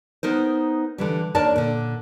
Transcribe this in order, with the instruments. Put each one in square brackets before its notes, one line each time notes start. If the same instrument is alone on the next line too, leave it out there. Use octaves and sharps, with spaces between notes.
[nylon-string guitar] B3 D#4 A#4 C5
D3 E3 G3
D#2 D4 A#4 C#5 D5 A5
A#2 D3